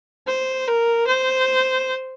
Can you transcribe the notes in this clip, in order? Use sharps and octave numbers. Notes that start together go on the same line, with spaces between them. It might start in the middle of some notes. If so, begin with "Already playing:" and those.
C5
A#4
C5